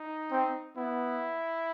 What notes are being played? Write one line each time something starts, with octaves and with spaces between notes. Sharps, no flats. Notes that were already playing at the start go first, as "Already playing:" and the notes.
Already playing: D#4
C4
B3 E4